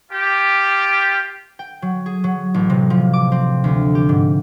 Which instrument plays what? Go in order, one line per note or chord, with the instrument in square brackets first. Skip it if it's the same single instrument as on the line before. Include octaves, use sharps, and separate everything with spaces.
[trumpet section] F4 G4
[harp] G5
F#3
G#4
F#3
A1
C3
F3
D6
C4
D2
G4
G#2